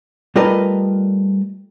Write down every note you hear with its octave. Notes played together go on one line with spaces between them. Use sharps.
G3 A3 F4 A#4 B4 D#5